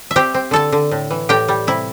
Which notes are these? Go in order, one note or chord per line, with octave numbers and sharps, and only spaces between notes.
E5
C4 G4 G5
C4
D3 A4 A5
D3
A2
E3
A2 G4 G5
G3
C3 E4